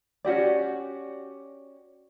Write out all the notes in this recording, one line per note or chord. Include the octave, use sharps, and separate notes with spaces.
C#4 F#4 G4 D5